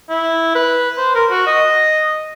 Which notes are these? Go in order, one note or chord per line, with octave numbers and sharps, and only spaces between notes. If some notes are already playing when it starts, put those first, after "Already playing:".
E4
B4
C5
A#4
F#4
D#5